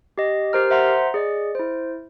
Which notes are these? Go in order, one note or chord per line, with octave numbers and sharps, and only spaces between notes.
G4 D#5
G4 A#4 C5 A#5 F6
C5 E5 F#5 A#5 C6
G#4 D5 D#5
E4 C5